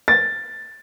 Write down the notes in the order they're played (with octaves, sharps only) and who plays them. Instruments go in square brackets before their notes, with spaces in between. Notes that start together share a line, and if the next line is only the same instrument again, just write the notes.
[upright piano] A6